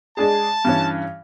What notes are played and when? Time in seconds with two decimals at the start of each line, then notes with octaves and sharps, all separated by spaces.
0.17 G#3 D4 G#4 A5
0.65 G2 E3 C#4